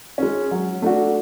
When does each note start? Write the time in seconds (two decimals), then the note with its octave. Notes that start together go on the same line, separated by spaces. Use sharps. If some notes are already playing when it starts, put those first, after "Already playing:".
0.18 G#3 C#4
0.51 F#3
0.82 A3 D4 F#4